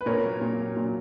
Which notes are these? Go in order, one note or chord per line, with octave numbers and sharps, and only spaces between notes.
B4
A#2 A#4 C#5
F#3
A#2
F#3
A#2